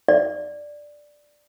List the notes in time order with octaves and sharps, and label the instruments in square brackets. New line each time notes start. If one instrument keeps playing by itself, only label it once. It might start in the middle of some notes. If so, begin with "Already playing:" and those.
[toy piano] D5